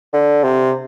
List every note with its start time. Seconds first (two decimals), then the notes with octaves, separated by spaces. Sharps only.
0.13 D3
0.44 C3